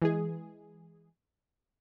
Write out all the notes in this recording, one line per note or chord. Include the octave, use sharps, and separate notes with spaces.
E3 G#3 G#4